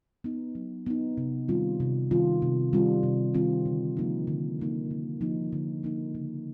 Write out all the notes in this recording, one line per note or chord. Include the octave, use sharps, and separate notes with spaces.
B3 D#4
F#3
B3 D#4
C3
D#3 G3 C4 F4
C3
D#3 G3 C4 F4
C3
D#3 G3 C4 F4
C3
D#3 G3 C4 F4
D3
F3 A#3 D#4
D3
F3 A#3 D#4
D3
F3 A#3 D#4
D3
F3 A#3 D#4
C#3